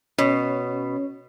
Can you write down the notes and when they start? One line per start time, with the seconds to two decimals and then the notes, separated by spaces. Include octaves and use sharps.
0.18 B2 C#4 C#5